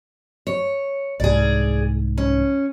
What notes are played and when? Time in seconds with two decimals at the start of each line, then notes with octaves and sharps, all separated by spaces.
0.47 C#5
1.20 C2 G#2 G#4 D5
2.18 C#4